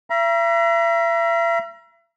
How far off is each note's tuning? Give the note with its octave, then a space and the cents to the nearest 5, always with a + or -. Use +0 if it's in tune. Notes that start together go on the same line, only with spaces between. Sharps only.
E5 +40 A#5 +35